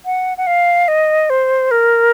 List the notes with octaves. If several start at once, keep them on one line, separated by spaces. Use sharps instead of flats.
F#5
F#5
F5
D#5
C5
A#4